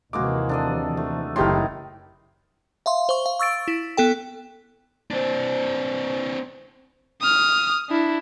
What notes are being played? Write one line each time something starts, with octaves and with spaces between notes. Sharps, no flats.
D#2 C3 E3 G#3 A#3 F#4 D6
D4 A4 D#5
A3
F#1 A2 D#4 G4 A#4 C6
E5 F5 C6
C5 C#6
F5
C#6 E6 A6 D7
E4
B3 A4 G5
C4 D4
D#6 F6
D4 E4